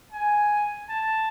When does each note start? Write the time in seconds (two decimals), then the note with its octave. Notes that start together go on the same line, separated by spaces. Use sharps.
0.12 G#5
0.89 A5